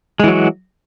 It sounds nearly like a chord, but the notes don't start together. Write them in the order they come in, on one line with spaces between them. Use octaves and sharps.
G#3 E3 F#3 F#4